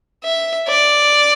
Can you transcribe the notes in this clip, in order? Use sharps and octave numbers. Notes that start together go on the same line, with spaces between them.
E5
D5